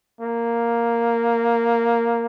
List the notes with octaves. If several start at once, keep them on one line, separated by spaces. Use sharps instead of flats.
A#3